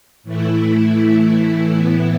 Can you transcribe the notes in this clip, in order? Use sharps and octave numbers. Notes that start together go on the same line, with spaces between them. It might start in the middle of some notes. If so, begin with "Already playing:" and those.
A2 E3 A3 E4
A2 E3 B3 E4